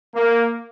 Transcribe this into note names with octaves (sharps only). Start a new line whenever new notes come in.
A#3